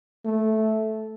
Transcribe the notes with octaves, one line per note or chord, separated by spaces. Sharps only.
A3